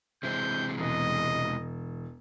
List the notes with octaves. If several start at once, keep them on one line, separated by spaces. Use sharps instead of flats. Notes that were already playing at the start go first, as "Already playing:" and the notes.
C3 E3 G#3 C4 G6
E1 D#5